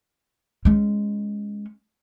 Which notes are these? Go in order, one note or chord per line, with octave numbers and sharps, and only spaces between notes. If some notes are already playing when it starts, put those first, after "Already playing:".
G#3 C#4